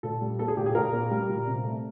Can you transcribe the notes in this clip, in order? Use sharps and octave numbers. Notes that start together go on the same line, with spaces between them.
A#2 A4
G3
A#3 A4
G#4
A#2 G4
G#4
A#2 A#4
A#3
G3
A#2
C3
A3